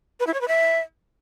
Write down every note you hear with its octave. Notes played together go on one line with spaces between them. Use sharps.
B4
E4
C#5
B4
E5